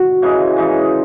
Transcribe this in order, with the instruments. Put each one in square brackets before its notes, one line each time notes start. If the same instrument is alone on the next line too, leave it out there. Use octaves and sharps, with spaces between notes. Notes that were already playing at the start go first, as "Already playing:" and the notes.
Already playing: [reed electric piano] F#4
[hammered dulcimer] C#3 E3 G#3 D#4
C#3 E3 G#3 D#4